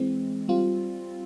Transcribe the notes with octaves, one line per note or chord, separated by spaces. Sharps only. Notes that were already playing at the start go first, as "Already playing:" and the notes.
Already playing: E3 G#3 C4
G3 C4 F4